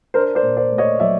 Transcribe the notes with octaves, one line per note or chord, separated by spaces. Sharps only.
D4 A#4 C5
C5 D5
A#2
C5 D5
A3
C#5 D#5
F#3 D5 E5